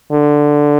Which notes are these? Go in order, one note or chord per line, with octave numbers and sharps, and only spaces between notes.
D3